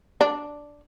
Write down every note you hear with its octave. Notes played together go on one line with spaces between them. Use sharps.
D4